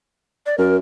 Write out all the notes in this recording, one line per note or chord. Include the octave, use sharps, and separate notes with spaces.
D5
F#2 A#4